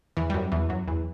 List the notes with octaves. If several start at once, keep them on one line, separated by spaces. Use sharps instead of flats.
E2 E3
G3
F#2 F#3
E2 E3
F#2 F#3
E2 E3